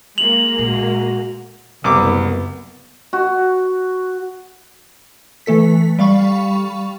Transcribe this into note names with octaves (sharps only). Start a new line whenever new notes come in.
G#3 A#3 F7 F#7
A#2 F#4
F#1 C2 B3 D6
F#4
E3 A3 A4 B6
G3 F5 B5 C#6